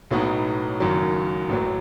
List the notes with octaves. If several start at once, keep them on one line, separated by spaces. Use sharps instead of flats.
B1 A2 F#3 B3 D#4
F#1 F#2 D#3 F#3
A1 A2 F#3